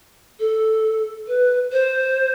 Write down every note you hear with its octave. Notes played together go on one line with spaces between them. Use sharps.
A4
B4
C5